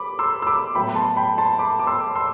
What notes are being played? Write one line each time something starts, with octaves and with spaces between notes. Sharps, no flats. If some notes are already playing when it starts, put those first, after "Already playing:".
Already playing: G3 B3 B5 D6
C6 E6
E6
B5 D6
A2 F#3 B3 G5 B5
B5
A5 C6
G5 B5
A5 C6
B5 D6
D6
C6 E6
C6 E6